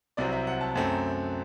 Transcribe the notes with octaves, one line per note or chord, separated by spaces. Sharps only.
C2 C3 F#3 C4 D5
E5
F#5
A5
F#2 F#3 A3 C4